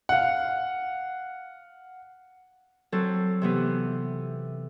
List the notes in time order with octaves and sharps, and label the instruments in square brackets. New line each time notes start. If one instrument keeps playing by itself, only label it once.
[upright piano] F5 F#5
[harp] F#3 C4 A4
C3 E3 B3